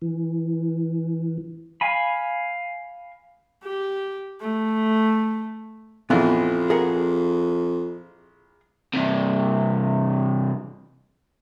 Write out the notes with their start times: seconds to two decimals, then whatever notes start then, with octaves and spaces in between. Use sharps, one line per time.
0.02 E3
1.81 F5 G#5 B5
3.63 G4
4.41 A3
6.10 A#1 F2 E3 B3
6.70 G#4 A#4 F#5
8.93 G2 C3